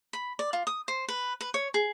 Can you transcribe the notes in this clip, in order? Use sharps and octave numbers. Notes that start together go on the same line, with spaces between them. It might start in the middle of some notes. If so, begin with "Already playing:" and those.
B5
D5
F4
D#6
C5
B4
B4
C#5
G#4